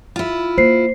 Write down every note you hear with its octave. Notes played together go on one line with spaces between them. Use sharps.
E4 F4
A#3 C5 C7